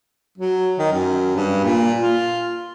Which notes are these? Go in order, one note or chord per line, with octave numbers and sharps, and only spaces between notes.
F#3
D#3
F#2
G2
A#2
F4